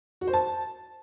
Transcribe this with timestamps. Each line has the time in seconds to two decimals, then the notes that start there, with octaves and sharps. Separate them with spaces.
0.21 F#4
0.27 C5
0.33 A5